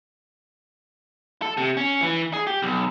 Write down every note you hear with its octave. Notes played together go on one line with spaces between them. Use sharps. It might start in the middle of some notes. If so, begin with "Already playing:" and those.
A4
C3
C#4
E3
G#4
G4
B1